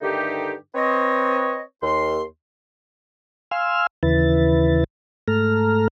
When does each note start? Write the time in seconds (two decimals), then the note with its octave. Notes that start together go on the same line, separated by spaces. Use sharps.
0.01 G2 D3 D#3 A3 D#4 G4
0.74 C4 B4 C#5 D#5
1.83 D#2 C6
3.51 F5 G#5 C6 E6 F6
4.03 D#2 C#3 E3 E4 B4 A6
5.28 G#2 A3 A4 A#5 F6